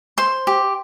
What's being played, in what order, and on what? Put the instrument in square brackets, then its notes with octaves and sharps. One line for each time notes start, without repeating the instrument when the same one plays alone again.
[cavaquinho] C5 C6
G4